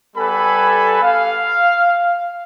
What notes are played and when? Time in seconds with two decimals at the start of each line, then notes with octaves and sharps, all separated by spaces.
0.17 G3 B3 A4 B4 G#5 B5
1.02 F5